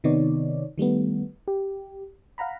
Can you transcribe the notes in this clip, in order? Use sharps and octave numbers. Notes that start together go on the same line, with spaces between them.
C3 D#3 B3 D#4 C#5 D5
D#3 G3 A3 B3
G4
F5 F#5 A#5 B5